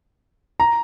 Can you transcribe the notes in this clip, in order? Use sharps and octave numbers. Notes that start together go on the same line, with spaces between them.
A#5